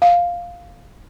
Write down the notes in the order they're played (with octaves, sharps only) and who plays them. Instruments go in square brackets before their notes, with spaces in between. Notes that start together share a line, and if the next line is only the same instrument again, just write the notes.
[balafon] F5